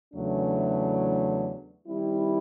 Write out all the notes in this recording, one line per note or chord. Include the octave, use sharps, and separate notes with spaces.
E2 C#3 F#3 A3 D4
D#3 G3 C4 E4